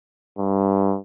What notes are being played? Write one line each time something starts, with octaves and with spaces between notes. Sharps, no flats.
G2